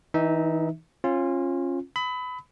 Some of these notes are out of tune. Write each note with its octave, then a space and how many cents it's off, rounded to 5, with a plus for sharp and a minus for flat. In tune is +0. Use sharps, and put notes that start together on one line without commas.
E3 -30 D#4 +0 E5 -20
C#4 -30 F4 +0
B5 +20 D#6 +45